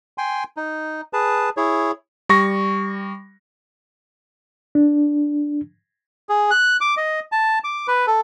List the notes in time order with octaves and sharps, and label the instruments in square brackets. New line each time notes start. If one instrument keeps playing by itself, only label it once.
[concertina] G5 G#5 C6
D#4
G#4 B4 A5
E4 G#4 C#5
[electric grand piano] G3 C#6 A#6
[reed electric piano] D4
[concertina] G#4
F#6
D6
D#5
A5
D6
B4
A4